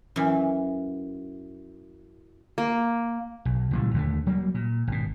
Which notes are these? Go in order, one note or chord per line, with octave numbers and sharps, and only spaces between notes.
F#2 E3
A#3
B1
C#2 A#2 E3 G3
D#2 D3 A3
F#3 G3 A#3
A#2
G#1 B2